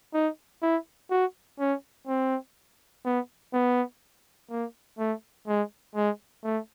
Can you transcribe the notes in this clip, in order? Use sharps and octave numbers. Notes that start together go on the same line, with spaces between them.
D#4
E4
F#4
C#4
C4
B3
B3
A#3
A3
G#3
G#3
A3